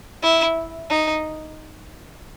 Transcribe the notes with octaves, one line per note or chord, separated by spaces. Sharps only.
E4
D#4